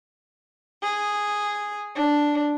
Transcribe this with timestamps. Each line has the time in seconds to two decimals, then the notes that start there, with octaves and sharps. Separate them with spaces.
0.82 G#4
1.95 D4